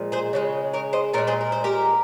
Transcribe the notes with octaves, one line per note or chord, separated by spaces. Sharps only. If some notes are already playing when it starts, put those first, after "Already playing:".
Already playing: A#2 F3 G#3
G#4 C5
C#3 F3 G#3
A#4 C#5
C5 D#5
A#2 G#3 A#4 C#5
G#4 C5
A#4
C5
G4 A#4